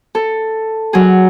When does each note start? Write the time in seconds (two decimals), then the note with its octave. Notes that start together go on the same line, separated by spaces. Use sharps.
0.15 A4
0.93 F#3 G#4